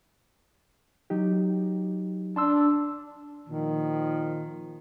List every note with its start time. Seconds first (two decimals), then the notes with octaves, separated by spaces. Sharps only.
1.10 F#3 D#4 G4
2.36 D4 A5 C6 E6
3.47 A#2 D#3 F3